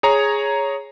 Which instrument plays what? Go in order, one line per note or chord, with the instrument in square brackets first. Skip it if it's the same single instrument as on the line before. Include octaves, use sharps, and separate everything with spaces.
[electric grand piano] G#4 C#5 A#5